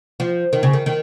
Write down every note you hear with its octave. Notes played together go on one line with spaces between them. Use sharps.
F3
D#3
C#3
D#3
D#3